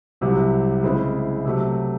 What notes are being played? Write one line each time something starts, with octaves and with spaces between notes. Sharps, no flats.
C2 C3 F#3
C#3 G#3 C4 E4
C3 F#3 A3